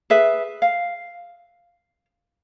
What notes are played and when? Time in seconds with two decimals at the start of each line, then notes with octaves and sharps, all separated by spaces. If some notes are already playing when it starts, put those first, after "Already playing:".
0.10 G#4 B4 E5
0.62 F5